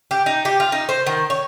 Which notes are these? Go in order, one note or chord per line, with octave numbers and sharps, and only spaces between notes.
G4
D#4
G4
F4
D#4
C5
D#3
C#5